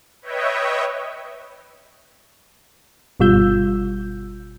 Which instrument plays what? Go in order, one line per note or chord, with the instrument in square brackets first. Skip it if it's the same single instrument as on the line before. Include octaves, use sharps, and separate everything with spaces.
[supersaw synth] B4 C#5 D#5 E5 G5
[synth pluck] G1 B2 G3 F4 E6 G6